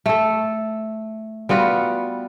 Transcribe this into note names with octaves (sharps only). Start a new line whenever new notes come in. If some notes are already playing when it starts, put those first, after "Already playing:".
A3 A4
G3 B3 F4 F#4